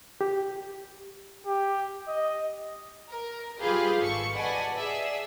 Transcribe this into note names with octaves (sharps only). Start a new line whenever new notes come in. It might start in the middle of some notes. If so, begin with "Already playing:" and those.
G4
G4
D#5
A#4
G3 F4 G4 G#4 B4 F5
G#1 A4 C#6 C#7
B4 D5 D#5 F#5 G#5 A5
G#4 D5 E5